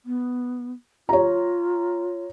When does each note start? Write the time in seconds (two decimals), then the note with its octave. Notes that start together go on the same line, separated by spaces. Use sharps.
0.05 B3
1.09 F4 C#5 A#5